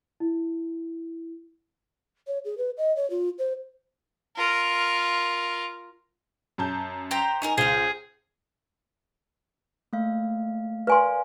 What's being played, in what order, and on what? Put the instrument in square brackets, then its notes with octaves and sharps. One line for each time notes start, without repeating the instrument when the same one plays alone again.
[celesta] E4
[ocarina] C#5
G#4
B4
D#5
C#5
F4
C5
[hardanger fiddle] F4 A#4
[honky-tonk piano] F#2 A5 G6
[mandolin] G4 C5 A#5
[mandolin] C#4 G#4 A#4 [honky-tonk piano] D#4
[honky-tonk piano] C#2 [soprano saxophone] G#4 [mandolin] C5 F5
[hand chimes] A3 A#3 F5
[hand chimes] A#4 D5 F5 [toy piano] B4 G#5 C6